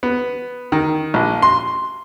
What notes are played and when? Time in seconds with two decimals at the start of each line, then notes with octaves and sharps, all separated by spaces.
0.03 B3
0.72 D#3
1.14 A#1
1.42 C6